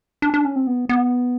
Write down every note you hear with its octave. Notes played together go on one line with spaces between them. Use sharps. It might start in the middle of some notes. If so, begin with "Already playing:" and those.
D4
D4
C#4
C4
B3
B3